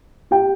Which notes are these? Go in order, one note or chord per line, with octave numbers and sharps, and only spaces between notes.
G4 G5